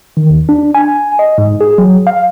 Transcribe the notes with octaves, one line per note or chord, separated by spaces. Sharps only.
D#3
D#2
D4
G#5
D#5
G#2
G#4
F#3
F5